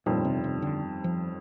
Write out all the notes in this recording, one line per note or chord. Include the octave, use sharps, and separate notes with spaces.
G1 F2 A#2 D#3 G3 C4
C3
C3
D3
F3